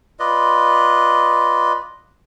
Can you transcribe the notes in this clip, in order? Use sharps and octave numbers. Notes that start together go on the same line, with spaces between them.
F4 B4 D5 D#5